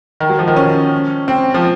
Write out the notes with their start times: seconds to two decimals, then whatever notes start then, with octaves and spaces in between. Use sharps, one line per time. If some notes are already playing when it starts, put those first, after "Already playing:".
0.20 D#3
0.29 F#3
0.39 F3
0.48 D#3
0.56 C#4
1.28 C4
1.54 F3